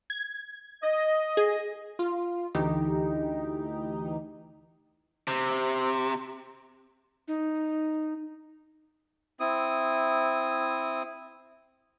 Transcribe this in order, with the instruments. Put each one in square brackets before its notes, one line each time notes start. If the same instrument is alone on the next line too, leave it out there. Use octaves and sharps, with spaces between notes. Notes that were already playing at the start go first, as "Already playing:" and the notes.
[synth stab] G#6
[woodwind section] D#5
[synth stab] G#4
[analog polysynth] F4
D2 E3 D#4 G4
[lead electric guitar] C3
[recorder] D#4
[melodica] C4 E4 D#6